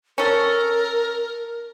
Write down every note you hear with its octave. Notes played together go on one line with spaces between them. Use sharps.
C#4 A4 A#4